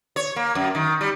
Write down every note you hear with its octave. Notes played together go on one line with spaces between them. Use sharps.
C#5
A#3
F#2
D#3
G3